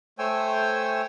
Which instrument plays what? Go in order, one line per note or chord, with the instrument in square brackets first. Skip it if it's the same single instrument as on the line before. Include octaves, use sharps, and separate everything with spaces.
[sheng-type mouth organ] A3 C5 C#5 G5 G#5 E6